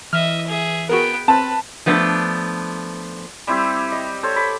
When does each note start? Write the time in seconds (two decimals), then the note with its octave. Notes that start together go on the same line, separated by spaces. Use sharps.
0.13 E3 D#5 E5 F6
0.47 G#4 E5
0.89 B3 F#4 G#4 A#4 G5
1.28 C4 B4 A5
1.86 F3 A3 B3 D4
3.47 G3 C4 E4 G4
3.92 D#5
4.23 A4 C5 C#5
4.36 B5 D6